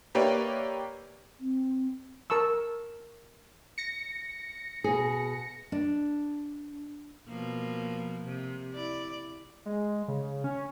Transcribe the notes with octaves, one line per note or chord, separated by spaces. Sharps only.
A#3 G4 B4 C#5 D5 E5
C4
A#4 A5 C#6 E6
A#6 C#7
B2 G#4
D4
B2 F3 A#3
C3
E4 D5
G#3
C#3
C#4